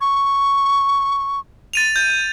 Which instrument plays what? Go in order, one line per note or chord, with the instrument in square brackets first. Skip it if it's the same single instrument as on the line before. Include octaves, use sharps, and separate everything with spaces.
[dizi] C#6
[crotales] A6 D#7 F7
G6